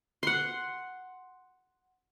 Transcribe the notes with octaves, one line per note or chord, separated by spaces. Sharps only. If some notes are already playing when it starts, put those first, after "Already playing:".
F#5 C6